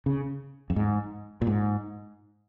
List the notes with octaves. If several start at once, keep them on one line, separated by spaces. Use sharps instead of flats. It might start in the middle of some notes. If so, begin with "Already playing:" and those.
C#3
F2
G#2
A#2
G#2